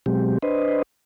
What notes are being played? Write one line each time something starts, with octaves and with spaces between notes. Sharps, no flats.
B2 F#3 G#3 C4 G4
D4 B4 C5 D#5